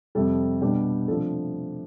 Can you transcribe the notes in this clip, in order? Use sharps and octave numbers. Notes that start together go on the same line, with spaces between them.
F2 C3 G3 A4
B2 G3 D4 G4
C3 F3 A3 D4 A4